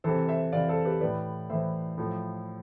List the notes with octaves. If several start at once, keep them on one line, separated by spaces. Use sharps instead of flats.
C3 E3 A4 C5
C5 E5
C3 E3 D5 F5
A4 C5
G4 B4
A2 E3 B4 D5
A2 E3 C5 E5
A2 F3